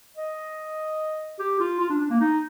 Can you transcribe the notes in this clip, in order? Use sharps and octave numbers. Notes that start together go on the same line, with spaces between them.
D#5
G4
F4
F4
D4
D4
A#3
D#4